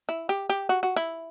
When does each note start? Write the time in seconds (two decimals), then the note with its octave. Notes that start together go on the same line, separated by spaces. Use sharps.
0.09 E4
0.29 G4
0.49 G4
0.69 F#4
0.83 F#4
0.96 E4